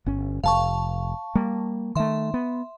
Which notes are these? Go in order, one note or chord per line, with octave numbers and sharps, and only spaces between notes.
G1 C#4
F1 F5 A5 C#6
G3 A#3
D#3 A3 E5 C6
B3